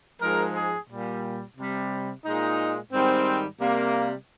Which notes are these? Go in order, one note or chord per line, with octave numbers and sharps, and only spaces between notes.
G#2 F3 G#3 A#4
G#4
A#2 G3
C3 G3
A#2 G#3 D#4
G#2 D#3 G3 C4
C3 G3 A#3